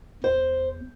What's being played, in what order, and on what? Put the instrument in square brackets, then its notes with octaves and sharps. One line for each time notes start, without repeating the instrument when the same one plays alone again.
[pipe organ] E2 [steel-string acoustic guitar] C5